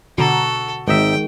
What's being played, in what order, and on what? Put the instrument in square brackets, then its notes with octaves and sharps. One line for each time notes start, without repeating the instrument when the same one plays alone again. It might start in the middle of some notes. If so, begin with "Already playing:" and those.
[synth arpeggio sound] B2 D3 A#5 [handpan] F#4 [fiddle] A4
[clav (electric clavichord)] G#1 D#4 E5 [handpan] D#3 G#3 [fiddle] G5